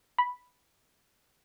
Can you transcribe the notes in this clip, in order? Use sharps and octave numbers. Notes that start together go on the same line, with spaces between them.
B5